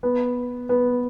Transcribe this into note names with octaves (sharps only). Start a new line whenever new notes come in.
B3
B3